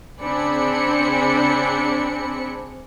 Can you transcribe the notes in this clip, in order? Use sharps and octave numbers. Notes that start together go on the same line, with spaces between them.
C#3 C4 D4 G#4 B5 C#7